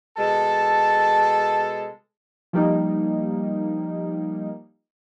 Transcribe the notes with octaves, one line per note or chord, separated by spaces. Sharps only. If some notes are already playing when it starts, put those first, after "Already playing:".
B2 G#3 A4 A5
F3 G3 A#3 D#4